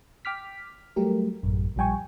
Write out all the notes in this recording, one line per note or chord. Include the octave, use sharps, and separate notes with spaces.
G5 D6 F6 B6
F#3 G3 A3 G4 A#4
A1 F#2
A#1 F3 G3 G5 G#5 C#6